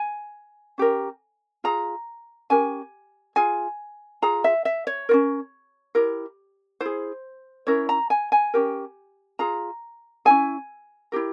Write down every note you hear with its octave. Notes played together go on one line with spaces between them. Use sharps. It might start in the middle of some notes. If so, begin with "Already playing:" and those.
Already playing: G#5
C#4 G4 A#4
F4 G#4 A#5
C#4 G4 A#4 G#5
F4 G#4 G#5
F4 G#4 A#5
E5
E5
C#5
C#4 F4 A#4
E4 G4 A#4
E4 G#4 C5
C#4 E4 A#4 C#5
A#5
G#5
G#5
C#4 G4 A#4
F4 G#4 A#5
C#4 E4 G#4 G#5
E4 G4 A#4